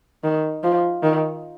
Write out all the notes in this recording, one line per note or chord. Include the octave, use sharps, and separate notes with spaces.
D#3
F3
D#3